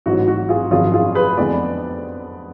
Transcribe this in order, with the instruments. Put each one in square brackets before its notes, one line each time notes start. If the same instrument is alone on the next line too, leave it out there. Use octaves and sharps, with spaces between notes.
[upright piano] A1 G#2 F#3 F#4
F#4
F4 G#4
G#1 F#2 F3 F4 G#4
F4 G#4
G#4 B4
F2 D3 G#3 B3 B4 D5